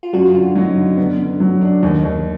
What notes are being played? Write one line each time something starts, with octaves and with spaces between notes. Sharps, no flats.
F4
F#2 F#4
D3 F4
F#3 D#4
D3
D3 B3
D3
F#3
D4
D#2 D#4
D#2